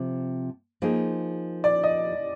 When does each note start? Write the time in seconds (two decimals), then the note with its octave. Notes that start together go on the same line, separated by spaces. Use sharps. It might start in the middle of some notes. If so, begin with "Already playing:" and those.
Already playing: C3 F3
0.82 F3 A#3 D#4 G#4
1.64 D5
1.84 D#5